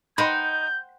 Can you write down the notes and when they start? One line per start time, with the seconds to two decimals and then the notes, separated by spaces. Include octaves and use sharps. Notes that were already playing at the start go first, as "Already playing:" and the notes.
0.18 D#4 C5 F#5 G5 B5 G6